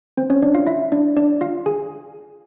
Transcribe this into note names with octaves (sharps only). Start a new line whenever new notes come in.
C4 C5
C#4 C#5
D4 D5
F4 F5
E4 E5
D4 D5
D4 D5
F4 F5
G#4 G#5